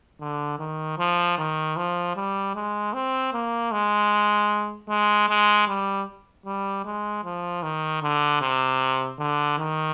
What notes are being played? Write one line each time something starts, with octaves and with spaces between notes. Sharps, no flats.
D3
D#3
F3
D#3
F3
G3
G#3
C4
A#3
G#3
G#3
G#3
G3
G3
G#3
F3
D#3
D3
C3
D3
D#3